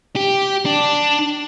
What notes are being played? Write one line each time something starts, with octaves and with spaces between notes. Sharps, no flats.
G4
D4